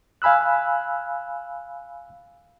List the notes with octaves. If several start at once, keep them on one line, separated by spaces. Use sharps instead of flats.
F5 G#5 B5 E6 F#6